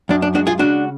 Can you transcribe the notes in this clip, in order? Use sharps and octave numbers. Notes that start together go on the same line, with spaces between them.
F#2 D4
D4
G#3 D4 F#4
F4 G#4
C#3 D4 F#4